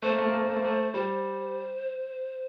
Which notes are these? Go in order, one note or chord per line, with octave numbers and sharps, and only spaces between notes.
A3 C5
A#3
A3
A#3
A3
A#3
A3
A#3
A3
G3 C5